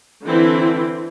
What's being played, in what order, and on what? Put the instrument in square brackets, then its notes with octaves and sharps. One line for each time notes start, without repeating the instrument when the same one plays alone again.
[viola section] D3 E3 C4 E4